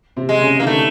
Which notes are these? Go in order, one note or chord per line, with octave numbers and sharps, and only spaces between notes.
C3 C4
G#3
C#3 C#4
A#3 D#4
D3 A3 D4